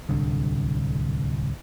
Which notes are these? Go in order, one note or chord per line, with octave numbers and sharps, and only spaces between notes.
D1 C2 D3